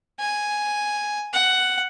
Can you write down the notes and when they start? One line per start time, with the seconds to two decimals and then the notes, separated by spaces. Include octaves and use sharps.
0.20 G#5
1.33 F#5